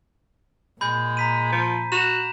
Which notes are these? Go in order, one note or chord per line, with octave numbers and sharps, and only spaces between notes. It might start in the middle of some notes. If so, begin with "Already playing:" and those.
A#2 G#3 B5 G6
A#5 B6 D#7
F3
F#4 E7 F7